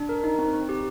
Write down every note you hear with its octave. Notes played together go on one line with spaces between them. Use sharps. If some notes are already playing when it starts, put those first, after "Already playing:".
Already playing: D4
A#4
D#4
C4
C4
G4